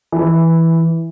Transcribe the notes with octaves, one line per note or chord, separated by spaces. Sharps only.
E3